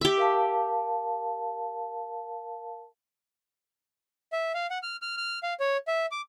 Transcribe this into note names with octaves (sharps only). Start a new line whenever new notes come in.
G4 E5
A#4 F5 A5
E5
F5
F#5
F6
F6
F6
F5
C#5
E5
D6